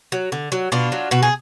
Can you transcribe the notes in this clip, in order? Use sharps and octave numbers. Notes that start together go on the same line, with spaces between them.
F#3
D3
F#3
B2 D4 F4
F#3
B2 F#4
G#4